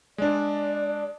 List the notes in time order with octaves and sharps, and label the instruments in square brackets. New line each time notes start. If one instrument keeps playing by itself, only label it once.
[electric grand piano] G#3 D4 [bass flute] D5